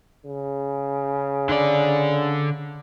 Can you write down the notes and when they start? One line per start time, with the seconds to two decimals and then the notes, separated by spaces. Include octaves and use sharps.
0.25 C#3
1.49 D3 D5